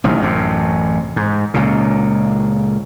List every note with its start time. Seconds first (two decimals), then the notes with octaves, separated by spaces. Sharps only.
0.04 A1 C3 D#3 G3
0.20 A1 F#2 C3
1.16 G#2
1.54 C#2 A#2 C#3